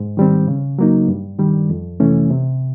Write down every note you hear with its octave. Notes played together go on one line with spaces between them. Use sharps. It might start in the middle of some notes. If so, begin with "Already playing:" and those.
Already playing: G#2
D#3 G3 C4
C#3
F#3 A#3 D#4
G2
D#3 G3
F2
C3 E3 A3 C#4
C3